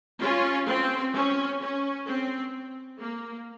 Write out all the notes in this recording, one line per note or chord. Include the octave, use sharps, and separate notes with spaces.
C#4 F4
C4
C#4
C#4
C4
A#3